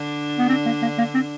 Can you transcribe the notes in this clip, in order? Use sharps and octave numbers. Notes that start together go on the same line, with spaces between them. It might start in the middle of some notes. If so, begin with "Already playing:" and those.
Already playing: D3 D4
B3
C4
A#3
A#3
A#3
C4